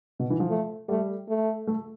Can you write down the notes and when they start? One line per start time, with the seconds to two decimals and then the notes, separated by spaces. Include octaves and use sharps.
0.19 B2
0.30 E3
0.40 F3
0.50 A3
0.88 G3 A3
1.28 A3
1.67 A3